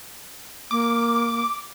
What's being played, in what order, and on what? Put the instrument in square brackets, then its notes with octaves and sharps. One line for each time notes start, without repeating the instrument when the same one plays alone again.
[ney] A#3 [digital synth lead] D6